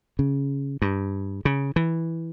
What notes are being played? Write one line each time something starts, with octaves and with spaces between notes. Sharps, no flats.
C#3
G2
C#3
E3